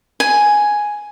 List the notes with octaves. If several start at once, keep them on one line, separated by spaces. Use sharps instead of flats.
G#5